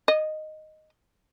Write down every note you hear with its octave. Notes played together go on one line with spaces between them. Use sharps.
D#5